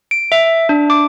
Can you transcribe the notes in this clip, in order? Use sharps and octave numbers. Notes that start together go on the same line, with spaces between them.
D7
E5
D4
D6